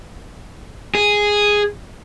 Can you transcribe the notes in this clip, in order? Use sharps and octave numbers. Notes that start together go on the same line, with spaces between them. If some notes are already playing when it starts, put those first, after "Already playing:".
G#4